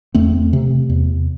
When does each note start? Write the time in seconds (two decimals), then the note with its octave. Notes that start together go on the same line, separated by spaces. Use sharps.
0.14 E2 A3 C4
0.53 C3
0.89 E2